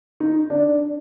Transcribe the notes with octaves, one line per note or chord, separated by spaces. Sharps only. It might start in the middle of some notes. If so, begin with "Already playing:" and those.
D#4
D4